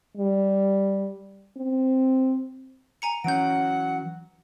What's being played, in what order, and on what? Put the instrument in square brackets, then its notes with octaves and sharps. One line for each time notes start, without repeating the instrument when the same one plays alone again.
[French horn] G3
C4
[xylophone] G#5 A#5 C#7
[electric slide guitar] E3 F#3 C#4 [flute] F#5 [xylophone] G6 D7